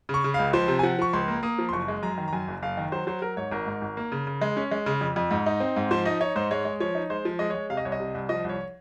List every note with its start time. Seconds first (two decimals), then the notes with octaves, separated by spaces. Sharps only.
0.09 C#3
0.14 C#6
0.24 C#3
0.34 C#2 F5
0.53 F3 C5
0.68 C3
0.79 G#5
0.83 F3 F#5
0.99 F3 C#6
1.13 C#2 C6
1.28 A#3
1.43 A#3 D#6
1.59 F3
1.69 C6
1.73 F#1 C#6
1.88 G#3
2.03 F#2 A#5
2.18 D#3
2.28 A#5
2.33 F#2 G#5
2.48 F#1
2.62 F#1 F5
2.77 D#3
2.92 F#3 C5
3.07 F#3 C5
3.22 F#3 A#4
3.37 G#2 C#5
3.51 G#1 A#4
3.66 G#2
3.81 G#1
3.97 A#3
4.12 C#3
4.27 C#3
4.41 G#3
4.57 C#4
4.71 G#3
4.86 C#3
5.01 F2
5.16 F2
5.31 G#2
5.46 D#4
5.60 C4
5.76 G#2
5.91 F3 C5
6.05 D#4 D#5
6.21 D#4 C#5
6.36 G#2 C5
6.51 G#3 C#5
6.65 G#3
6.80 F3 C#5
6.95 D#4
7.10 G#3 C5
7.25 F3
7.39 G#3 D#5
7.50 G#3 C#5
7.70 C3 F5
7.77 D#5
7.85 C2 C#5
7.92 D#5
8.00 C3
8.15 C2
8.29 F3 D#5
8.45 C2 C#5